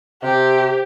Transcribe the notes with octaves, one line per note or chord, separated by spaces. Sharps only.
C3 G4